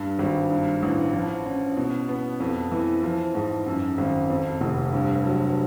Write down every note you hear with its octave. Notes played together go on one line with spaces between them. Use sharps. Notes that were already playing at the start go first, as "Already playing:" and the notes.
Already playing: G2
G#1
G2
A1
F3
C#4
B2
B3
F2
E3
F3
G#2
F#2
G#1
F2
F1
G2
F#3